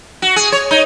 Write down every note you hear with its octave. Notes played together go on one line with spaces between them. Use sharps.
F#4
G#4
C#5
D#4